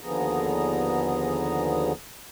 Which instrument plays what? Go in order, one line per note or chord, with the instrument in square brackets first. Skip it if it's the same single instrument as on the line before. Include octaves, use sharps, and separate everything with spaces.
[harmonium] D#2 D3 F3 B3 G#4 A#5